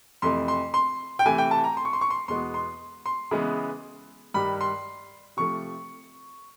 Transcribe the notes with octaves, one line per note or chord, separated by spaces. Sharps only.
F2 C3 E3 A3 C6
C6
C6
G5
C3 E3 A3 G#5
G5
A5
A#5
C6
C#6
C6
C#6
C6
E2 B2 G#3 B3 C6
C6
C6
C#3 E3 G#3 B3
G2 D#3 G3 B5
C6
C3 F3 A3 C#6